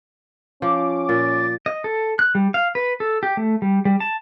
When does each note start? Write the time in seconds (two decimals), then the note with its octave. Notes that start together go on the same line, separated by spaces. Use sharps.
0.62 F3 C#4 D6
1.09 A#2 A6
1.66 D#5
1.84 A4
2.19 F#6
2.35 G3
2.54 F5
2.75 B4
3.00 A4
3.23 G4
3.37 A3
3.62 G3
3.85 G3
4.00 A5